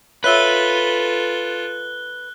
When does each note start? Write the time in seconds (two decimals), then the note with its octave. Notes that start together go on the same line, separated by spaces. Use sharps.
0.24 F4 A4 B4 C#5 E5 E6 F#6 G7